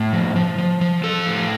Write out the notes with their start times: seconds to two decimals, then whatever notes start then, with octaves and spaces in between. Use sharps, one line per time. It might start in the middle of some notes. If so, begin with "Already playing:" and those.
Already playing: A2
0.13 F3
0.36 F3
0.58 F3
0.81 F3
1.04 F3 A4
1.26 A2